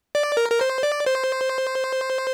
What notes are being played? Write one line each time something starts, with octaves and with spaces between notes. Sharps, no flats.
D5
A#4
A#4
C5
D5
C5